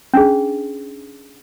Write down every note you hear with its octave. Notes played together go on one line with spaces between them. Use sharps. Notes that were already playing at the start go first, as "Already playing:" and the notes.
C#4 D4 G#4